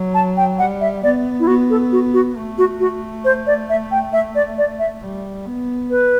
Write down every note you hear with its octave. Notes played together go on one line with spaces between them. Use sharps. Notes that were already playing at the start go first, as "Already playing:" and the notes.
Already playing: F#3
A5
G5
G3 F#5
E5
B3 D5
E4
B3 F#4
A4
F#4
F#4
A3
F#4
F#4
C5
D5
E5
G5
E5
D5
D5
E5
G3
B3
B4